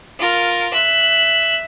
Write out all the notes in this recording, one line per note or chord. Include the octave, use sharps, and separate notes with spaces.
F4 A#4
E5 F#6